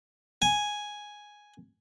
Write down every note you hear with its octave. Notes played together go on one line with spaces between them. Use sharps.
G#5